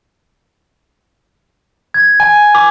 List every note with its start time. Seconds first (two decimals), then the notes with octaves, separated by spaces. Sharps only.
1.94 G#6
2.20 G#5
2.55 D6